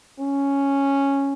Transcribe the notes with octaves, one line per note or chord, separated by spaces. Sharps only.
C#4